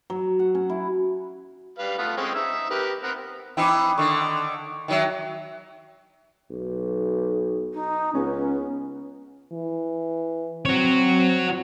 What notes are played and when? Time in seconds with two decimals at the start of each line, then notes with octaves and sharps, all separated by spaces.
0.10 F#3
0.39 F#5
0.55 C#4
0.70 E4
1.78 G3 B4 F5
1.98 A3 B3 F4
2.17 G#3 C4 C#4
2.35 D#4 E5 E6
2.70 G4 A#4 B4
3.03 B3 C4 A#4
3.57 E3 C4 D#4 G5 B5 D6
3.98 D3 D#3 C#6
4.88 D#3 F#3 E5 G5
6.51 B1
7.73 D#4
8.14 C#2 B3 C#4
9.52 E3
10.65 C4 F#4 C#5